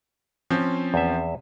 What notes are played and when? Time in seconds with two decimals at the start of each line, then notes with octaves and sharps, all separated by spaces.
0.50 F3 C4 C#4
0.94 E2 E5